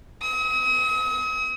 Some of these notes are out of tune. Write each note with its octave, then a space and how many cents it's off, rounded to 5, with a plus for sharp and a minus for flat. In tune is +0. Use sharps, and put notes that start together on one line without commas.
D#6 +45